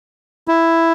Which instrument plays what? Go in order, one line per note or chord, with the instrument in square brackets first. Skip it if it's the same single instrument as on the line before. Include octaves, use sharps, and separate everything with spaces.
[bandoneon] E4